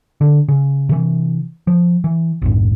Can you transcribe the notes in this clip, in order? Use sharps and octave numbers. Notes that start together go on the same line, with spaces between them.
D3
C#3
C3 E3
F3
E3
A#1 F2 G#2